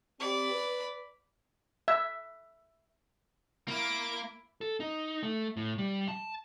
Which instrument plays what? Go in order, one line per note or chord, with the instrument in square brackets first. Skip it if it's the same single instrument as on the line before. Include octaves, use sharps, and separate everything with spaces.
[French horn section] C4 G4 [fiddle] D5 B5
[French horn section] B4
[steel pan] E5
[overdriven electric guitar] A#3 [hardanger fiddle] E4 D6
[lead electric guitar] A4
D#4
A3
A2
G3
A5